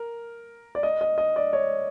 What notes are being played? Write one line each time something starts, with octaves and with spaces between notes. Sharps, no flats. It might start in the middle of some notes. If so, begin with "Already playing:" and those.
Already playing: A#4
D5
D#5
D#5
D#5
D5
C#5